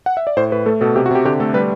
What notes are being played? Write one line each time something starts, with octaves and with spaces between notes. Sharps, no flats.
F#5
E5
D5
A2 C5
A2 B4
A3 A4
B2 A4
C3 G4
F#4
C3 G4
D3 G4
A3 A4
G3 B4